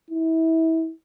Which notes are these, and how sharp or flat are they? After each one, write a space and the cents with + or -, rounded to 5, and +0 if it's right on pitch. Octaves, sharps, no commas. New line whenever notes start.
E4 -30